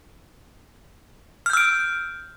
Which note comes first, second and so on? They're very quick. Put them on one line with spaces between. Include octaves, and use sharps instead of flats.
F6 G6 E6 D7